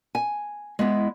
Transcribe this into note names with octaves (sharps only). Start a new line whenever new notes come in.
G#5
G#3 B3 E4